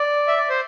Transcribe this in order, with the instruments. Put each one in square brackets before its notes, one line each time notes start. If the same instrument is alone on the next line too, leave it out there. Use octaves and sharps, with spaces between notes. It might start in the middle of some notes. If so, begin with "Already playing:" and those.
Already playing: [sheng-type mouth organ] D5
E5
D5
C5